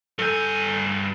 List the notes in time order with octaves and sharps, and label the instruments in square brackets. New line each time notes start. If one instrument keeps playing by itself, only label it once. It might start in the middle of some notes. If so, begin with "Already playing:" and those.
[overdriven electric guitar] G2 G#5 [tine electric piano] A4 E6 G6